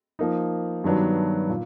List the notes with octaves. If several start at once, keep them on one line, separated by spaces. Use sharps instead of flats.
F3 A#3 D#4
G2 D#3 F#3 B3 D4
A#2